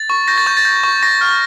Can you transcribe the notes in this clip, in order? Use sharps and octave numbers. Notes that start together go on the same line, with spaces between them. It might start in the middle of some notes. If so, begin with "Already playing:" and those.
Already playing: A6
C#6
G6 A#6
A6
C#6 G6
A6
G6
C#6
C#6 A#6
F6